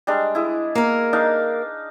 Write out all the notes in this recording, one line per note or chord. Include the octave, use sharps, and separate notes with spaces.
G3 G#3 D4
E4 G#4
A#3 A#4
D4 D#4 F5